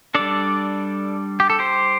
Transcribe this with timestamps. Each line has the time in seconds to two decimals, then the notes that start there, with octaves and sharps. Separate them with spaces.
0.15 G3 D4 A4 D5
1.40 G4
1.50 A4
1.59 G4 C5